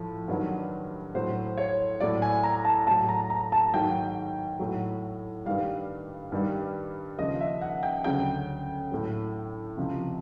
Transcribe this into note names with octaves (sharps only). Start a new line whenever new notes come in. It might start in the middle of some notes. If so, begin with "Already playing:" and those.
Already playing: A2 F3
G2 D#3 F#3
A2 F#3 C5
C#5
A2 F#3 D5
G#5
A#5
A5
A2 F#3 A5
A#5
A#5
A5
G#2 D#3 F#3 G5
A2 F#3
G2 D#3 G3 F5
G2 D#3 G3
D#2 C#3 F3 D#5
E5
F#5
G5
D2 C#3 F#3 G5
A2 F#3
C#2 C3 F3